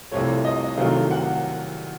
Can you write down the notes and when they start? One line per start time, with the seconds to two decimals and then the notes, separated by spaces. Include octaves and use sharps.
0.11 C2 C3 F3 A3 C#5
0.45 D#5
0.77 C2 C3 D#3 F#3 A3 F5
1.11 F#5